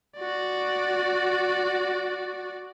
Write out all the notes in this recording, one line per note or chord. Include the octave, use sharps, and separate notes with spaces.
F#4 D5